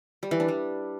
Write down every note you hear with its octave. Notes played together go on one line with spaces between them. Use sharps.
G3
E3
D4
G3